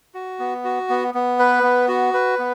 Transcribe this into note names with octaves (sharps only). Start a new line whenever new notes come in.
F#4
B3
F#4
B3
B3
B4
B3
F#4
B4
B3